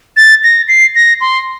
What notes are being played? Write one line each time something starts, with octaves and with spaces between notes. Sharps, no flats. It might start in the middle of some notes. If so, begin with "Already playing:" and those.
A6
A#6
C7
A#6
C6